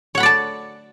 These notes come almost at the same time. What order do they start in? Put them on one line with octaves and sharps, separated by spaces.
C#5 F#5 B5 D5 A5